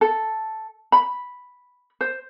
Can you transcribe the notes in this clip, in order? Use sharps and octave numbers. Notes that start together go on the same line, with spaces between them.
A4
B5
C5